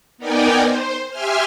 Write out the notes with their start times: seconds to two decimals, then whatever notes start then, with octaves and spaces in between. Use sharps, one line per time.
0.18 B3 D#4 A#4 D5 G5 G#5
0.64 C5
1.10 G4 E5 G#5 C6 F6